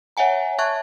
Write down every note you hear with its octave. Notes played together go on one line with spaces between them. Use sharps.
C#5 E5 F#5 G#5 A#5
E5 A5 C#6 F#6 G#6